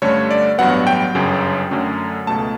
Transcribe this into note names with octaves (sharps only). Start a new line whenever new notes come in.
G2 D3 A3 C#4 C#5
D5
A1 G2 F#3 B3 F#5
G5
G1 F#2 C#3 F#3
F#2 D3 F#3 A3 C#4
C#2 B2 A3 A5